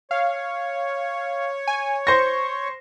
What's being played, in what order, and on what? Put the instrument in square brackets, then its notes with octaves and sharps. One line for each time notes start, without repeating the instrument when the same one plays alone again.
[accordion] C#5 [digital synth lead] F5
[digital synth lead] G#5
[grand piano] C5 A#6 [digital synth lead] C#6